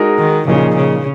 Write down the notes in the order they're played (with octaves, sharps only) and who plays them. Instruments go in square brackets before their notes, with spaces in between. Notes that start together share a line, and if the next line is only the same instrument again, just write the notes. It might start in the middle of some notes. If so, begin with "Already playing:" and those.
Already playing: [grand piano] G#3 D#4 F#4 A#4 D#5
[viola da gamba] D#3
[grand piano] A#2 F3 A#3 D#4 G#4 [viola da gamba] C#3
[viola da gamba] C#3